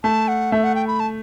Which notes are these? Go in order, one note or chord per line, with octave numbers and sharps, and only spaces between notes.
A3 A5
F#5
A3 E5
F#5
G5
B5
A5